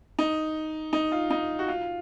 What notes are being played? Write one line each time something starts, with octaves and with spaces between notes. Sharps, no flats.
D#4
D#4
F4
D#4
F#4
F4